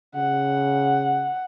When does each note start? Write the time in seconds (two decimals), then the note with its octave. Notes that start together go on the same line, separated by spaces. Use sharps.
0.16 C#3 F#5